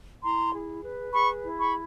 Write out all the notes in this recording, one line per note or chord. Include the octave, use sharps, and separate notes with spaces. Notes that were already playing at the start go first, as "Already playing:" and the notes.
E4 A#5 C6
G#4
B4
G#4 B5 C#6
E4
B5 C#6